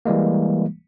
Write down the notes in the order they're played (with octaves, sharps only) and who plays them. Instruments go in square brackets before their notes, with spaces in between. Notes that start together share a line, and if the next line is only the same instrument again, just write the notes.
[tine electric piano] E3 G3 G#3 A#3